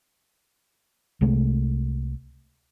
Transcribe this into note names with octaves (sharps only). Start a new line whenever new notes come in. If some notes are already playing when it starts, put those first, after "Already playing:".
C2 C3 G#3 A3